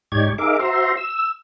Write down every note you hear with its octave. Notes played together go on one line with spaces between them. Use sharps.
G#2 D#4 G4 C#5 D5 G#6
D#4 G#4 A#4 E5 F5 D6
F#4 C5 E5 A#5 C6
E6